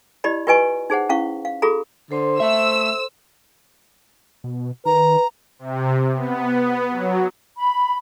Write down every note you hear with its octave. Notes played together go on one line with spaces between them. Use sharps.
E4 G4 D5 D#5 B5
F4 G4 B4 D#5 G#5 C#6
D#4 G#4 C5 F#5
C#4 E4 F5 C#6
F5
F4 F#4 G#4 A4 A#5
D3 A4 C5 C6
A3 E5 E6
B2
D#3 B4 A#5
C3
B3
F#3
B5